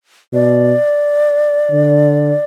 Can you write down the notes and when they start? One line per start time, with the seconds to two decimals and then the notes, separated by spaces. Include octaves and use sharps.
0.33 B2 D5
1.72 D3